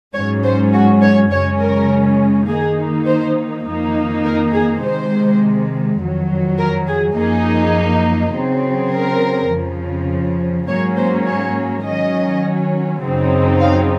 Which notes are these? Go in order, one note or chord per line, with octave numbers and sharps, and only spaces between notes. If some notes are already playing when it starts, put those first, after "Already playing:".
G#2 F#3 C#4 C#5
C5
F#4
C#5
F#2 C#3 G#3 C#4 C#5
A#4
D#3 A#3 D#4 G#4
C5
F2 D#3 A#3 D#4
A#4
G#4
C3 D#3 G#3 C5
F2 D#3 F#3
A#4
G#4
F#2 F3 A#3 D#4 G#4
C#3 F#3 C4
A#4
F2 C#3 F3
G#2 F#3 A#3 C#4 C#5
C5
C#5
D#3 F#3 C#4 D#5
F#2 C#3 F#3 C4 D#4
F5